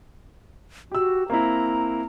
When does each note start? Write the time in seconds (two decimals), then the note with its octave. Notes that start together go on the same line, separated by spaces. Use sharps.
0.92 F#4 G4 E6
1.30 A#3 C4 E4 A#5